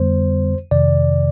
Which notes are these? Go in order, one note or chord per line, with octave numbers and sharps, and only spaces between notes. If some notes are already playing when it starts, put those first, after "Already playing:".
Already playing: F2 D3 G3 B3 C5
F2 C3 D#3 D5